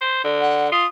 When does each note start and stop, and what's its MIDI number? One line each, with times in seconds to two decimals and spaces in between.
0.01 0.23 72
0.24 0.67 50
0.41 0.68 78
0.72 0.85 65
0.72 0.87 87